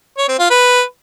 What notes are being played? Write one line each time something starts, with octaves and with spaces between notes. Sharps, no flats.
C#5
C4
F4
B4